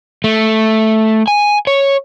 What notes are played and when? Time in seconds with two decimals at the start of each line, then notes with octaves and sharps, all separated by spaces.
0.24 A3
1.28 G#5
1.67 C#5